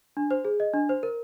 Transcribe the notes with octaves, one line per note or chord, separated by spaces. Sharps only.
D4
C5
G#4
D#5
D4
C5
A#4